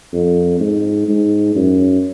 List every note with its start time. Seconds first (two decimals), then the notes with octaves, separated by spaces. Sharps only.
0.13 F2
0.60 G#2
1.08 G#2
1.56 F#2